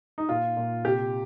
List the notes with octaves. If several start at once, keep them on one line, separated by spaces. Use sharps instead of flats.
D#4
A#2 F4
A#2
C3 G4